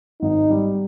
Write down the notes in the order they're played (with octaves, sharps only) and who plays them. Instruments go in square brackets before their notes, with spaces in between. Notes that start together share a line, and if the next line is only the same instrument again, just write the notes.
[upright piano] G#1 [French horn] D#4
[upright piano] G3